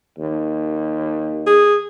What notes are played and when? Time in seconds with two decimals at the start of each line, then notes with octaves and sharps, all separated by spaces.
0.19 D#2
1.46 G#4